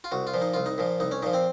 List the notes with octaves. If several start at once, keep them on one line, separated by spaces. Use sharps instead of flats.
F4
C2 F#4
F4
A#2 F3
D#4
C2 F4
D#4
A#2 F3
C2 D#4
C#4
A#2 F3 D#4
C4